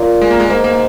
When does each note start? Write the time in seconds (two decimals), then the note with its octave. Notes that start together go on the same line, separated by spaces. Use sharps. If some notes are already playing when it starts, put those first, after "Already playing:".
Already playing: A#2
0.21 G#3
0.31 A#3
0.40 G#3
0.50 G#2 A#3
0.64 A#3